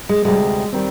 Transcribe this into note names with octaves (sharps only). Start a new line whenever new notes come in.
G#3
D2 C3 G3 G#3
D#3 G3 C4